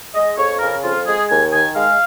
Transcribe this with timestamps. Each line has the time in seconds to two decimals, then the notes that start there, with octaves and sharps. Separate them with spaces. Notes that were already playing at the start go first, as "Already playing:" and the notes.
0.14 G#3 D#5
0.36 F2 C#5
0.59 C#3 A#4
0.83 F2 F4
1.06 G#3 G#4
1.29 D#2 G#5
1.52 D#3 G#5
1.75 G#3 F5